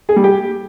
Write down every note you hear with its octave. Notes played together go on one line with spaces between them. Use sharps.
G#4
G3
G4